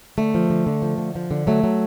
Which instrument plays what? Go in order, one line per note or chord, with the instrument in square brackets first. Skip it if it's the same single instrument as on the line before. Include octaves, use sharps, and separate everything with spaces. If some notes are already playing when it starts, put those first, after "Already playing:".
[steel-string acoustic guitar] D3 A3
F3
D3
D3
F3
D3
F3
D3
F#3 A3
F#3